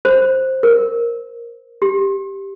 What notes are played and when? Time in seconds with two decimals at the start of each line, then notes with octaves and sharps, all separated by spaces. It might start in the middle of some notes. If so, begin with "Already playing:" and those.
0.05 C5
0.63 A#4
1.82 G4